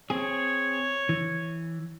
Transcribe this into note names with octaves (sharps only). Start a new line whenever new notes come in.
C4 G#4 C#5
E3